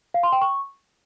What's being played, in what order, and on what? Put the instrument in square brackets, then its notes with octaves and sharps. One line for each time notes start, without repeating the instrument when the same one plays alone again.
[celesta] F5
C6
G5
C#6